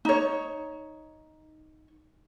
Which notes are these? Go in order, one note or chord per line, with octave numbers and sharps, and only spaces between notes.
D#4 C#5